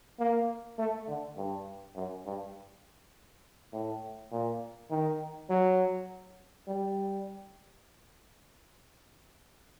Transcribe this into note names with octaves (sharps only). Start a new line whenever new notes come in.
A#3
A3
D3
G2
F#2
G2
A2
A#2
D#3
F#3
G3